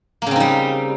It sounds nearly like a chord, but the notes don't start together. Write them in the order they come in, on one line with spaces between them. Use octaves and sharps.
A#3 C#3 C4 D#4 G3